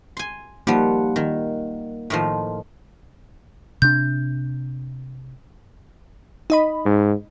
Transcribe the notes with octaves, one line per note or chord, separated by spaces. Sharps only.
G#5 C6
F3 G3 A#3 D#4 F#5
D#3
A2 D#3 F3
C3 D4 G6
D#4 D#5 B5
G#2